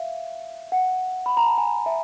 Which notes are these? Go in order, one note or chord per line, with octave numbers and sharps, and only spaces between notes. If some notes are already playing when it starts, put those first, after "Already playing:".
Already playing: E5 F5
F#5
B5
A#5
A5
G#5
E5